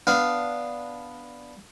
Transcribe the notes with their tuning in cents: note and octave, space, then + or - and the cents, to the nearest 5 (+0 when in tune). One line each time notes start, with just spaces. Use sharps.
B3 +0 D4 +0 F5 +0